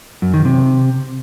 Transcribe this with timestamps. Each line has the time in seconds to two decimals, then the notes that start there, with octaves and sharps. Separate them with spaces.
0.22 F#2
0.34 D#3
0.45 C3